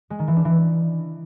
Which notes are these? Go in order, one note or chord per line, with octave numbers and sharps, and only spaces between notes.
G#3
D#3
E3
D4
E3